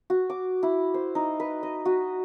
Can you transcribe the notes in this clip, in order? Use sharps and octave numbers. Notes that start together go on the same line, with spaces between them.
F#4
D6
E4
C5
D#4
B4
D#5
F#4